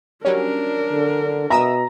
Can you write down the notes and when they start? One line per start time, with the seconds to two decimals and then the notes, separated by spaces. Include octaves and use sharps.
0.25 F#3 G3 C#4 D4 A#4
0.92 D3
1.50 B2 E5 A#5 D#6 E6